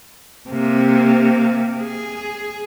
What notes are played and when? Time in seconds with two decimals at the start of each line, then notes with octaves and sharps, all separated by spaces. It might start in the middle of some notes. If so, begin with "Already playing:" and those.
0.50 C3 A#3
1.81 G#4